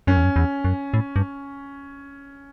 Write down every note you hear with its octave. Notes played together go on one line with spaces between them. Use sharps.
F#2 C#4
E2
F#2
E2
F#2
A2
G2